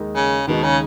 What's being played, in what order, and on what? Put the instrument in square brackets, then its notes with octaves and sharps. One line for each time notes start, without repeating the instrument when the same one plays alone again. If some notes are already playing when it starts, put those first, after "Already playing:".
Already playing: [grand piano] D#2 D#3 G#3 D#4
[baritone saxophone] C#3
[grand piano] D#2 D#3 G#3 D#4 [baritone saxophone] B2
[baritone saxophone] C#3